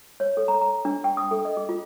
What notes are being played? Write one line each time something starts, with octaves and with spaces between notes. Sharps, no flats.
C#5
A4
A#5
A#5
D4
G5
D#6
A4
D#5
G#4
F4